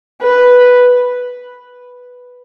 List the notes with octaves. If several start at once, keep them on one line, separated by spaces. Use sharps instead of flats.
B4